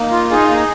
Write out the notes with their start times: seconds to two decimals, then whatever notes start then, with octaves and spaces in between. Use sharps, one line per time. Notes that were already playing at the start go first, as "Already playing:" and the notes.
Already playing: A#3 D#4
0.11 F4
0.30 D#4 G#4
0.49 A#3